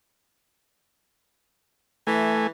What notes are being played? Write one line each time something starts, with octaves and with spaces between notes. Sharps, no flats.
E3 A3 G#5